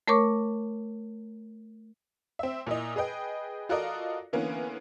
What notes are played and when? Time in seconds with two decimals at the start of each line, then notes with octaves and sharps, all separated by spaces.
0.08 A3 A#4 C#5 C#6 D6
2.39 C4 E5
2.67 A#2 E4 D#5
2.96 G#4 B4 D#5 G5
3.69 F4 F#4 A4 A#4 D5 D#5
4.33 D3 E3 A#3 B3 C#4